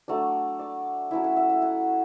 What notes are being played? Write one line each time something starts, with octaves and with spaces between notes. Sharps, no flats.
F#3 A3 D4 D5
D5
F#3 C#4 E4 E5
F#5
E5
E5
F#5